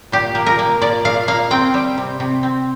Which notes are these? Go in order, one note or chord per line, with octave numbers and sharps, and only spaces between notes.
A#2 G4
A#3
A#4
A#3
A#2 D5
A#2 F5
A#3 F5
C4 G5
G3
C3
C3
C4